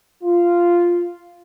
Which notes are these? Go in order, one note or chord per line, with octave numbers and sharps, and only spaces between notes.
F4